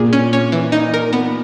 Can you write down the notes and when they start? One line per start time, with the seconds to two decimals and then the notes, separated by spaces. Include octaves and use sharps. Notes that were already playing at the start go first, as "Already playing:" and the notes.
Already playing: A#2 G#4
0.13 C#4
0.33 C#4
0.52 E3
0.72 D#4
0.94 A#4
1.13 B3